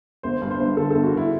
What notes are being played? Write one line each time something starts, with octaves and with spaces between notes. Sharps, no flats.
G1 C5
G2
C5
G1
D3 A4
G1 A4
F#4
D3 E4